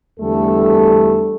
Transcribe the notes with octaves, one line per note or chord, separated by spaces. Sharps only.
E2 D3 G3 A3 A4